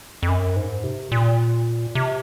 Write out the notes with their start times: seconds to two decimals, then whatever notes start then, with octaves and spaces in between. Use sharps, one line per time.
0.23 F2
0.29 F#2
0.56 G#2
0.84 C3
1.12 A#2
1.95 C3